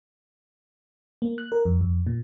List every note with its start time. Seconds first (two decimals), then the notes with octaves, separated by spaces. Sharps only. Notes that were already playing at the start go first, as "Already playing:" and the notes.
1.22 A#3
1.38 F#6
1.52 A#4
1.65 F2
1.81 F2
2.07 A#2